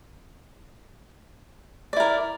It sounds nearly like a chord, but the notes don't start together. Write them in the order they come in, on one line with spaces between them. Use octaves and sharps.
D5 E4 A#4